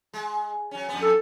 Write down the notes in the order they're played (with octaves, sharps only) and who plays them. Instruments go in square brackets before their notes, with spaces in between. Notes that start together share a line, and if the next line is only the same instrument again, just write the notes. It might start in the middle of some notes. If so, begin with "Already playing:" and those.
[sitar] G#3
F#3 C#4
F2 B3
[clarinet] A4